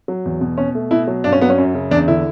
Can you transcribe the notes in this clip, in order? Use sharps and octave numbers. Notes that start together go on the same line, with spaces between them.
F#3
E2
B2
B2 C#4
A3
B2 E4
F#3
G2 D4
C#4
F#3 B3
C#4
F#2
C#3
E2 D4
D3 E4